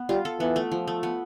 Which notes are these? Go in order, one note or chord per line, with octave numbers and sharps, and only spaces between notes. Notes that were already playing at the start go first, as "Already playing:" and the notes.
Already playing: B3
G3 F4
A4
E3 B3
A3
F3
A3
B3